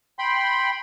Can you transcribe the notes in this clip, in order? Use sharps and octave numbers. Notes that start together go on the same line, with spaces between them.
G5 B5 C6